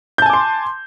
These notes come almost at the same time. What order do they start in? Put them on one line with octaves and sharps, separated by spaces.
G6 A5 G#5 D6 C6